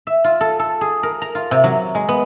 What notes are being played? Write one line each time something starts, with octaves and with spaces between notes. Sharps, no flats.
E5
F4
A4
A4
G#4
A#4
A#5
F4
C3
F#3
G#3
B3